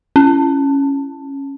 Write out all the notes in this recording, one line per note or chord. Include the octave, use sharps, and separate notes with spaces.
C#4